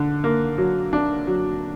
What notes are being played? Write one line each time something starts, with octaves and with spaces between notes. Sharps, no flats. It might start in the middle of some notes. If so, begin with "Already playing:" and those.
Already playing: D3
A#3
F#3
D4
F#3